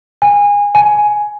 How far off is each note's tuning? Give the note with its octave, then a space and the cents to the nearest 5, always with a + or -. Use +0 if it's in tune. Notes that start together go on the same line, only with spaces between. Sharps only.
G#5 -25
G#5 +10